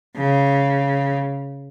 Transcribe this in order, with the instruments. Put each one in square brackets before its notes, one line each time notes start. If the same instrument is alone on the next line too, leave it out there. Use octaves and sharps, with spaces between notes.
[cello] C#3